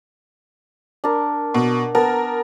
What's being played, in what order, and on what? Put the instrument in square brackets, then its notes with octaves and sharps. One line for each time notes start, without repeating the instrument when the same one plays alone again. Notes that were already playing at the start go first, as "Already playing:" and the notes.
[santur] D4 A#4
[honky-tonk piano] B2
[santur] B3 A5 [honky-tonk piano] A#4